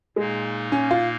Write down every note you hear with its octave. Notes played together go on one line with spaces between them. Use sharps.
A#2 G#3 A#3 D#4
C#4
F4